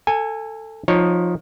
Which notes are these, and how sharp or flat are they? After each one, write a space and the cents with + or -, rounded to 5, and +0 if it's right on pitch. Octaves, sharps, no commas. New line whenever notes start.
A4 +15 G#5 -15
F3 +15 D#4 +0 C#5 +0